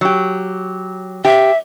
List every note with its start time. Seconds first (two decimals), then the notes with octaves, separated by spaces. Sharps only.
0.01 F#3 G4
1.25 G4 E5